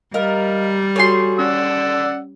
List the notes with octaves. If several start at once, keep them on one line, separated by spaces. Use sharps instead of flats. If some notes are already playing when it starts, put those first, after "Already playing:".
G3 A#4 D#5 F5 F6
F#4 A4 C#5 G#5 C6
C#4 D5 F#5 E6